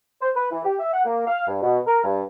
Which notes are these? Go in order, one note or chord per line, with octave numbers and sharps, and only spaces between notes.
C5
B4
E3
G4
E5
F#5
A#3
F5
G2
B2
A#4
G2